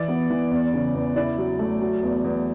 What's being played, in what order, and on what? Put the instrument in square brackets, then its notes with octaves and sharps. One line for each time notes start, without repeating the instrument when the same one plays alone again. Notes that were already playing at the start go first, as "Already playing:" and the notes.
Already playing: [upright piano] E3 D5
B3
E3
E2
C#3
E2
E4 D5
F#3
A3
F#3
E2
E2